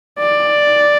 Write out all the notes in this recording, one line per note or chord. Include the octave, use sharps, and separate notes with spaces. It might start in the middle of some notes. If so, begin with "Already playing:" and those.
D5